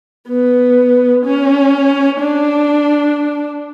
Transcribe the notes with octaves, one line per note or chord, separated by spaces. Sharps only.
B3
C#4
D4